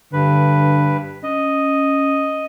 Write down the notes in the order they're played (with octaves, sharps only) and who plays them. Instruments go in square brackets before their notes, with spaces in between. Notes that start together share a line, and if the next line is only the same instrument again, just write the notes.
[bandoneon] G2 B4 [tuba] D3
[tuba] C#4 [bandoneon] D#5